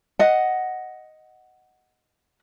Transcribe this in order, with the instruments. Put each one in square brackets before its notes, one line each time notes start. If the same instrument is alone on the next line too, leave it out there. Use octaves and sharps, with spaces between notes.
[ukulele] D#5 F#5